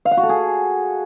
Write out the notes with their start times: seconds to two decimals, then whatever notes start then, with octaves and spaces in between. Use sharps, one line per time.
0.05 F5
0.11 F#5
0.17 F#4
0.23 A4
0.29 G#4